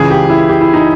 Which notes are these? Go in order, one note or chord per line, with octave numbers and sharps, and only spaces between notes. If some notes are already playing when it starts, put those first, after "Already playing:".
Already playing: C#2 C#3 E3 G#4
G4
E4
G4
E4
D#4